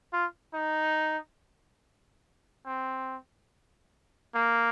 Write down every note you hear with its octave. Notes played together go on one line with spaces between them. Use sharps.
F4
D#4
C4
A#3